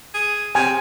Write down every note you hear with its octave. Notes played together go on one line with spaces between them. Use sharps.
G#4
C3 G#5